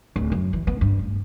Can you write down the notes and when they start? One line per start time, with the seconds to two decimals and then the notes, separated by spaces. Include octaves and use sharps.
0.16 D1
0.32 F#2
0.53 E3
0.67 B3
0.81 G2
0.99 D1